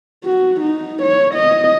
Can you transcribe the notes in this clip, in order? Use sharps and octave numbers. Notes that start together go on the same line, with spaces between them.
F#4
D#4
C#5
D#5